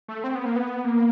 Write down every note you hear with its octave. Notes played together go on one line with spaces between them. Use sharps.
A3
C4
B3
A#3
B3
A#3